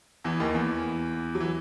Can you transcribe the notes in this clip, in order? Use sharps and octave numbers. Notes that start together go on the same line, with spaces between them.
E2 E3
D#2 D#3
E2 E3
F#3
E3